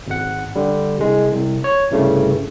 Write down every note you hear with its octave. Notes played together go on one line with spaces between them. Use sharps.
G#1 F#5
D3 G3
C2 G#3
C2
C#5
C2 G2 C#3 A3